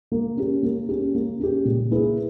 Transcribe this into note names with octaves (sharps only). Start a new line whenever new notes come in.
A#3
C#4 G4
A#3
C#4 G4
A#3
C#4 G4
A#2
A#3 E4 G#4 B4